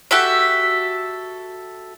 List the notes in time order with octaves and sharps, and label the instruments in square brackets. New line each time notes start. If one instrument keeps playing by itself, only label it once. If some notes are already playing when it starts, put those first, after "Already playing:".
[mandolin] F#4 G4 A4 E5